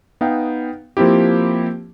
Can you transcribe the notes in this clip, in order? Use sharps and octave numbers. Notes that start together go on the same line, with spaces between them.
B3 D#4 F5 G5
F3 A#3 C4 E4 G4